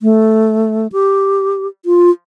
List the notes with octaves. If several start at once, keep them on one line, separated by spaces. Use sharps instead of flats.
A3
G4
F4